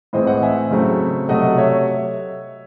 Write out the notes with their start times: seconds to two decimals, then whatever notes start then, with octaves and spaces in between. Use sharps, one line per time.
0.13 A2 E3 G#3 C4 C5 D#5
0.27 D#5 F#5
0.42 E5 G#5
0.71 C#3 F#3 A3 C4
1.29 C3 F#3 A3 D#5 F#5
1.58 C#5 E5